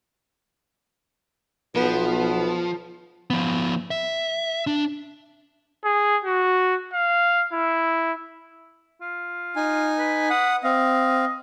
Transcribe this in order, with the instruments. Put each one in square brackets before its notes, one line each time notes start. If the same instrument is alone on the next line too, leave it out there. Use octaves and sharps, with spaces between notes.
[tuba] B1 [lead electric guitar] F3 [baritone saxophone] B3
[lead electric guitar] F3 B3
E5
D4
[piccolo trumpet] G#4
F#4
F5
E4
[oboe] F4
[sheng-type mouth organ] D#4 G#5
[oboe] B4
[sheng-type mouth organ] F#5 D#6
[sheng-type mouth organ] C4 F5 [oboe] D#5